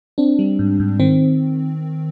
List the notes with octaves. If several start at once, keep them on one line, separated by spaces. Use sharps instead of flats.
C4 D4
G3
G#2
G#2
D#3 C4